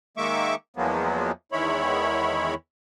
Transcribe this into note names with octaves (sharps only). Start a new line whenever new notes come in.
D#3 G#3 A#3 E5 C#6 D6
E2 F3 F#3 G#3 A#3 B3
E2 D#3 G#3 E4 C#5 B5